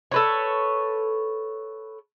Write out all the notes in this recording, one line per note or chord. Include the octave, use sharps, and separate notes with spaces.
A4 B4 C#5